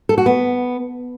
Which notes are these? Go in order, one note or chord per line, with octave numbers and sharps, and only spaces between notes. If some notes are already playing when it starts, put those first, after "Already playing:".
A4
F#4
B3